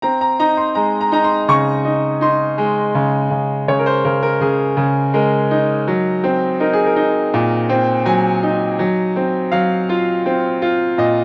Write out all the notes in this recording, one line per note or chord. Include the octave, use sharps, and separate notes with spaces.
C4 A#5
A#5
D#4 A#5
C6
G#3 A#5
A#5
D#4 A#5
C6
C#3 C#6
D#4
D#4 C6
G#3
C#3
C#3
C#3 C#5
A#4
C5
C#3 A#4
A#4
C#3 G#4
C#3
G#3 A#4
D#4
F#3
C4
D#4 A#4
G#4
A#4
D#4
A#2
C4
F#3 G#5
D#4
F#3
C4
F#3 F5
F4
C4
F4
A#2 D#5